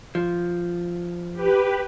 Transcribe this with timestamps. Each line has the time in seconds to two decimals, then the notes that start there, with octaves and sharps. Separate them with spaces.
0.15 F3
1.34 G4 B4